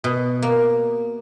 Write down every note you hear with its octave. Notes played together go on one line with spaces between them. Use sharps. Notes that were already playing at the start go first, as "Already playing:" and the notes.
B2
A#3